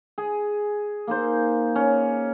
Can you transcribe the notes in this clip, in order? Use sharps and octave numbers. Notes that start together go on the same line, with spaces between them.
G#4
A#3 D#4 C5
C#4